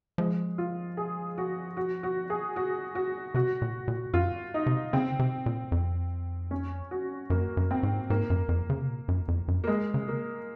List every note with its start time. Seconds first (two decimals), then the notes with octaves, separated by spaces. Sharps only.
0.18 F3 G#3
0.58 F4
0.97 G#4
1.38 F#4
1.77 F#4
2.03 F#4
2.30 G#4
2.56 F#4
2.95 F#4
3.34 C3 F#4
3.62 A#2
3.88 A#2
4.14 F#2 F4
4.54 D#4
4.66 C3
4.93 C#3 C4
5.19 C3
5.46 A#2
5.72 F2
6.51 C#4
6.91 F#4
7.30 F#2 A#3
7.57 F#2
7.71 C4
7.83 G#2
8.10 G#2 A#3
8.30 F#2
8.49 F2
8.70 C#3
8.81 C3
8.88 A#2
9.08 F#2
9.28 F2
9.48 F#2
9.64 A#3
9.67 G#3
9.94 C#3
10.08 A#3